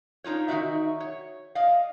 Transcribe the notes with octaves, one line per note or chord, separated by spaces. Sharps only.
D4 D#4 F4 C#5
D#3 D#4 F4 F#4 D5 E5
C#5
D5 D#5 F5